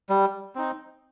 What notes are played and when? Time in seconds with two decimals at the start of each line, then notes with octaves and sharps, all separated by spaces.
0.09 G3
0.55 C4 D#4